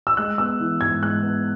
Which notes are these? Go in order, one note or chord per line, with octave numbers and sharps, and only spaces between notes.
E6
G#3 F#6
B3 E6
E3
G#2 G#6
G#3 F#6
B3